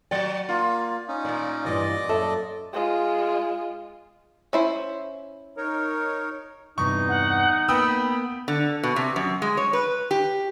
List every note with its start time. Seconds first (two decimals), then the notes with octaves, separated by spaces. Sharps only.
0.11 F#3 F#4 D5 G5
0.49 A#3 F4
1.08 C#4 D#4
1.25 A#2 A#3 D5
1.65 G2 E3 G3 D5 D#5
2.09 F#2 A4 E5
2.73 G#3 F4
4.53 C#4 E4 C5
5.57 D#4 A#4 C#5
6.78 E2 G2 C3 D#4 C#6
7.09 F#5
7.68 A#3 B3 G5 B5 D#6 E6
8.48 D3
8.83 B2
8.96 C3
9.16 F#2
9.42 G#3
9.57 C#5
9.73 B4
10.11 G4